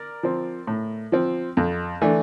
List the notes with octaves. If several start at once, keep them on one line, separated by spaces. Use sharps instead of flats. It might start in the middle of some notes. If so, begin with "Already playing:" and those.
Already playing: A#4 D5
F3 C4
A2
F3 C4
F2
E3 A3 D4